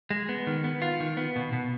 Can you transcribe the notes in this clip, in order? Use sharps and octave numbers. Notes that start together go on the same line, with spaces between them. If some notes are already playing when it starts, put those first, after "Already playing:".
G#3
B3
D#3
B3
F4
D#3
B3
B2
B2